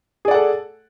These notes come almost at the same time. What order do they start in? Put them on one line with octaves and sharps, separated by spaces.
G#4 D5 F#5 A4